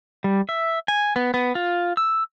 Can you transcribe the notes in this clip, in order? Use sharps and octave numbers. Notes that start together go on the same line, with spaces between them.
G3
E5
G#5
B3
B3
F4
E6